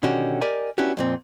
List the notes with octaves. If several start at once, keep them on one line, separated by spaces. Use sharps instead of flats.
B2 D3 D#3 C#4 F#4 G4
G4 A#4 D5 D#5 G#5
B3 C#4 D4 E4 F#4 G4
F2 A#2 C4